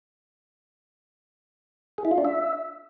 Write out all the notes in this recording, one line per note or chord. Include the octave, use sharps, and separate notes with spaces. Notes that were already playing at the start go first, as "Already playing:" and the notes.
G#4
E4
F4
D4
E5